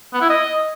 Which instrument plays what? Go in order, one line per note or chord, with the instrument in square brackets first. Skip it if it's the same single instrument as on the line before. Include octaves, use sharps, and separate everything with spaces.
[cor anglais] B3
E4
D#5